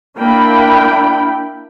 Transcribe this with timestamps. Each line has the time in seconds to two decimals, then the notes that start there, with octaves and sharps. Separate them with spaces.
0.19 A#3 D4 E4 G5 B5